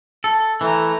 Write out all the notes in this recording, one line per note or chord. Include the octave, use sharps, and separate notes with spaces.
A4
E3 A3 A#5